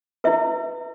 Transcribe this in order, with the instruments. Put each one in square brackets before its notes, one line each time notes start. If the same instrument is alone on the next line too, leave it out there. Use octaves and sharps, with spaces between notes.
[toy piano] E4 B4 E5